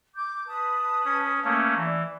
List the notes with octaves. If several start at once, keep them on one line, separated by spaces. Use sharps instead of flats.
D6 G6
B4 A5 D#6
C#4
A3 A#3 C#4
E3 D5